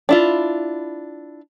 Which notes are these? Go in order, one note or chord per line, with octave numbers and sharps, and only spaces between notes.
D4 E4 F4